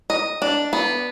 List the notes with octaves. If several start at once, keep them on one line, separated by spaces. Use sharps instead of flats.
D#5
D4
B3